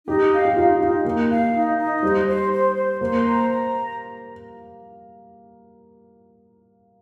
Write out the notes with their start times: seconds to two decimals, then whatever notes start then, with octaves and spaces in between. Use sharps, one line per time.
0.07 D#4 G4
0.32 F5
0.45 G4
0.56 D#4 F4
0.80 D#4 F4
1.05 A#3 D#4
1.30 F5
1.54 D#4
1.78 D#4
2.02 G3 C5
2.27 C5
2.52 C5
2.76 C5
3.01 A#3 C5
3.25 A#5
3.50 A#5